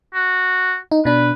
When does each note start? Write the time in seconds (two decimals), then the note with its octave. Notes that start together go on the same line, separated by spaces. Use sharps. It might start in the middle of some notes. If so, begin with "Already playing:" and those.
0.15 F#4
0.92 D#4
1.05 B2 D4 B4